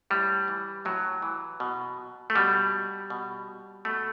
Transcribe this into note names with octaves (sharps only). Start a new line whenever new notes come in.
A2 G3
E3
A2 F#3
E3
B2
A3
B2 G3
B2
B2 A3